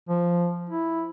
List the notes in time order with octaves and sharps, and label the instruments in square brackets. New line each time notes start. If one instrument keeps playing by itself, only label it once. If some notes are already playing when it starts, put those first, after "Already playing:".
[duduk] F3
E4